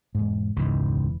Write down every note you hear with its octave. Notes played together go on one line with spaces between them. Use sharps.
E1 G#2
E1 C#2 G#2 E3